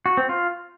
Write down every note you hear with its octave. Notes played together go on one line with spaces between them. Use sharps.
F#4
C4
F4